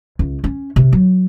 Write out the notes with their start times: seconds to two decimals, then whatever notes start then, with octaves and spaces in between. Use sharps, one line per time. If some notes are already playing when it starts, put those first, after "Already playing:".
0.19 C#2
0.44 C#4
0.76 C3
0.93 F#3